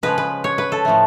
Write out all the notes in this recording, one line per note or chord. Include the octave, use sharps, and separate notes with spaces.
C#3 F3 G#3 B4
B4
C#5
B4
A4
A2 F3 A3